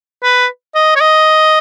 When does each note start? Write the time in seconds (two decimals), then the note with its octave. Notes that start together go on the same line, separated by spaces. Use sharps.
0.23 B4
0.75 D#5
0.96 C#5
1.01 D#5